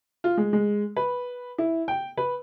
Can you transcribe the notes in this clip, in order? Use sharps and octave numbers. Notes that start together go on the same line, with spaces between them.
F4
G#3
G#3
B4
E4
G5
B4